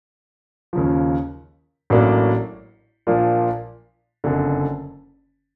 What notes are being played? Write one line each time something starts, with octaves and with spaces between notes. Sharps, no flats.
D#2 C#3 F3
A1 A2 F#3 A#3 D4
A#2 F3 A#3 D4 F4
F#1 F2 D3